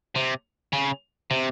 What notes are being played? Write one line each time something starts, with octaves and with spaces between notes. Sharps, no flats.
C3
C#3
C3